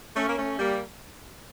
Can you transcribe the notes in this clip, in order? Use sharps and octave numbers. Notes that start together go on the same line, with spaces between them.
A3 C#4
A#3
A3 C#4
G3 A#3